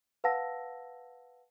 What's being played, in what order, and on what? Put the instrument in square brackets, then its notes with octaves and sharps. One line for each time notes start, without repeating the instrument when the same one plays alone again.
[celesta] B4 F5 F#5 A5 E6 A#6